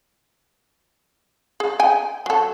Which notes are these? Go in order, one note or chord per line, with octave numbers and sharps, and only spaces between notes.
G#4
G5 G#5
F#3 A4